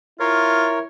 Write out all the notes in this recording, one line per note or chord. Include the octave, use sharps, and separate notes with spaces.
E4 F4 A#4 C#5